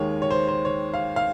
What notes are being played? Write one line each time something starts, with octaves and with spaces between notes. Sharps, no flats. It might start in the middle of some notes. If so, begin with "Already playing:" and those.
Already playing: D#2 D#3 G#3 C#5
C#5
C5
C5
C#5
F5
F5